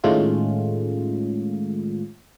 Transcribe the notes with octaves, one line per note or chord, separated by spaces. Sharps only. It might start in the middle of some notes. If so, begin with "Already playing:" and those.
A2 D#3 G#3 A3 C#4 F4